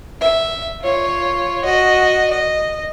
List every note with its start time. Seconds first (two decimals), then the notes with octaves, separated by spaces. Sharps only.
0.21 E5
0.81 F4 C#5
1.64 F#4 D#5
2.30 D#5